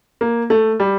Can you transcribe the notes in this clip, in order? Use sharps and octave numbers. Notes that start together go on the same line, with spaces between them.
A#3
A3
G3